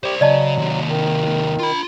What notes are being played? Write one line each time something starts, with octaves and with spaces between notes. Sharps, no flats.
G4 C5 D5
C#3 F#3 D5 D#5 A5
D#2 C3
D#3
F4 B5